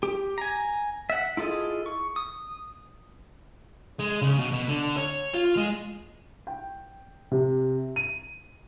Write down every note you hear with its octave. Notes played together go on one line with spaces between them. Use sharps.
G4
G#5 A#5
E5 F#5
E4 F4 G#4 A4 D#5
C#6
D#6
G#3
C#3
B2
B2
D3
C#5
F4
G#3
G5
C3
D#7